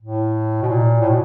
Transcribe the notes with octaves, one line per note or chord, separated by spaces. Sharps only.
A2
B2
A#2
A2
B2